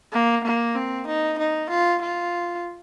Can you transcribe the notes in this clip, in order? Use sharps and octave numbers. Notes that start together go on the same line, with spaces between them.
A#3
A#3
C4
D#4
D#4
F4
F4